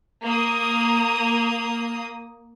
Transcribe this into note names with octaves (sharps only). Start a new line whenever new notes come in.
A#3 D#6